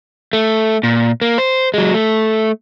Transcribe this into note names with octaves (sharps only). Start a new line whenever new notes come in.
A3
A#2
A#3
C5
F#3 G#3
A3